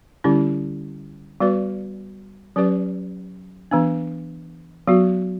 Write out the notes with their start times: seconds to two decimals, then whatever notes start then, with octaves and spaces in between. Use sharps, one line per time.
0.24 D3 G3 C#4 E4 G4
1.40 G3 B3 F#4 B4 D5
2.56 F#3 C#4 G4 B4 D5
3.71 E3 B3 D4
4.87 F#3 B3 F#4